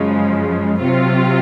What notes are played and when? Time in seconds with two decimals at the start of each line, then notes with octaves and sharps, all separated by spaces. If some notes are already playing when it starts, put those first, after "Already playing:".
Already playing: F#2 C#3 F3 G#3
0.80 C3 F#3 C4 F4